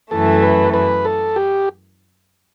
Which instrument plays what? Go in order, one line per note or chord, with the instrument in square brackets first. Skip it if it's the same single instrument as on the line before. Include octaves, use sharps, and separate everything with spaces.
[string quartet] F#2 E3 A3 [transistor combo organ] A4
[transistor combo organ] B4
B4
A4
G4